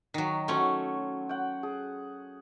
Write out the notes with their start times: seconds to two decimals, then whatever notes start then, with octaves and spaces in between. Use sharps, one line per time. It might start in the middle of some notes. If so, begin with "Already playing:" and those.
0.14 D#3 F#3
0.48 F#3 A3 C#4 C6 C#6
1.29 F#5 G5
1.63 G#4